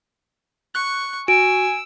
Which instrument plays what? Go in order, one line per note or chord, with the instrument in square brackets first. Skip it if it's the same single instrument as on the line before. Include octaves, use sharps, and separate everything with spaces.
[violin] C#6 [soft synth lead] F#6
[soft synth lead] F#4 [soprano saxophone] G#5 [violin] E6 [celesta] D7